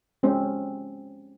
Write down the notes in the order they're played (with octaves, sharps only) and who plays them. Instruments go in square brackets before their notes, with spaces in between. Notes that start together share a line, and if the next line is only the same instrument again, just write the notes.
[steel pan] G#3 C4 C#4 C5